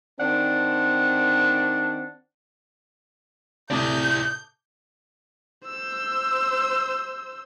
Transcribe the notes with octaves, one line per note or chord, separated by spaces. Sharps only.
D#3 C4 D4 F#5 A5
A2 C3 E4 D5 A5 D6 D#6 G6
C5 E6